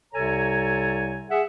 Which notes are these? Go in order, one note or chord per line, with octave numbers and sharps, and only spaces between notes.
C2 C3 A4 C#5 G#5 A#5
G#4 E5 F#5